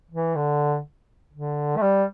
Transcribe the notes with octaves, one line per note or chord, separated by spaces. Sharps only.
E3
D3
D3
A3
G3